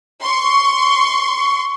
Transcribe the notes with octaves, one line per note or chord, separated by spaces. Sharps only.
C6 C#6